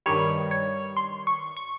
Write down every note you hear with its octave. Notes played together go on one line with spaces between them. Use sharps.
G2 D#3 G3 C#5
C#5
C6
C#6
C#6